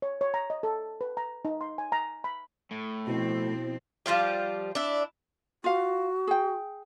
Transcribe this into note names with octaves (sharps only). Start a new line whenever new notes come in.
C#5
C#5
A#5
D#5
A4
B4
A#5
D#4
C6
G#5
A#5
B5
A2
B2 F3 C4 E4
F3 G3 F4 G4
D4 E4
F4 F#4 F5
G#4 G5